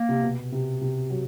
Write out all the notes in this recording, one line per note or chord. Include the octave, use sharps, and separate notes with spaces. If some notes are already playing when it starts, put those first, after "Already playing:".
Already playing: A#3
C3
B2
C3
C3
F#3